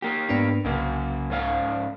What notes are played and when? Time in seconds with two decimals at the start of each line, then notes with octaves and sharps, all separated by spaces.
0.02 A#3 G4
0.29 G#2 B3 D4
0.65 C2 C#3 A#3
1.30 G#2 C#4 F5